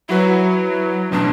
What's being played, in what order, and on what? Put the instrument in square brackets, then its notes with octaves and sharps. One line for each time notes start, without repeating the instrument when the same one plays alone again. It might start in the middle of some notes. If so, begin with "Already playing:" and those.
[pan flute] F#3 [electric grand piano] E4 F#4 B4
[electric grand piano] A1 B2 [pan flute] D4